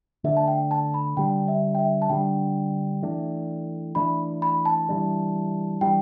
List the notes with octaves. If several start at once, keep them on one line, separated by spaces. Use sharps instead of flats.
D3 A3 D4 E5
A5
G5
A5
B5
D3 G3 D4 G5
E5
G5
E5
A5
D3 G3 D4 G5
E3 A3 D4
E3 A3 D4 B5
B5
A5
E3 G3 D4
E3 G3 D4 G5